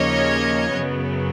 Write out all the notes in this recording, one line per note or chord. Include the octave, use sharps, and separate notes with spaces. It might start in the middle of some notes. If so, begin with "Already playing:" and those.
Already playing: D#2 C#3 F3 A#3 C#4 C#5 D#5
F#2 C#3 F#3 B3